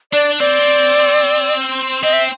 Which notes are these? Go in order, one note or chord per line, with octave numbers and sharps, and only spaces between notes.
D4 D5
C4 D5
C4 D#5
E5